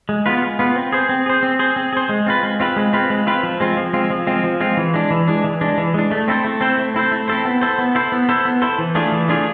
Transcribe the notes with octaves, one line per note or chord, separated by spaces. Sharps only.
G#3
B3 F4 B4
G#3
B3 F4 B4
C4
G#4 C5
C4
G#4 C5
C4
G#4 C5
C4
G#4 C5
G#3
C4 F4 B4
G#3
C4 F4 B4
G#3
C4 F4 B4
G#3
C4 F4 B4
F3
G#3 C4 F4
F3
G#3 C4 F4
F3
G#3 C4 F4
F3
G#3 C4 F4
E3
G#3 D4
E3
G#3 D4
E3
G#3 D4
E3
G#3 D4
A3
C4 E4 A4 C5
A3
C4 E4 A4 C5
A3
C4 E4 A4 C5
A3
C4 E4 A4 C5
B3
E4 A4 C5
B3
E4 A4 C5
B3
E4 A4 C5
B3
E4 A4 C5
E3
A3 D4 F4 G#4
E3
A3 D4 F4 G#4